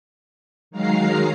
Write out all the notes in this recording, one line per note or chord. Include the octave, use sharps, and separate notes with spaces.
D#3 F#3 G#3 F5 A#5 C7